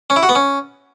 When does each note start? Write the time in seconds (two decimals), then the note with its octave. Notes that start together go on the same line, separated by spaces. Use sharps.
0.10 C#4
0.16 E4
0.23 F#4
0.29 B3
0.35 C#4